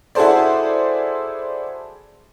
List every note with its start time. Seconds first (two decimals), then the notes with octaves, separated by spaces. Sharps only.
0.15 E4 F#4 G#4 A4 C5 D5